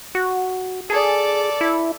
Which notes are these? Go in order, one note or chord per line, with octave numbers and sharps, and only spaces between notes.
F#4
G#4 A4 D5
E4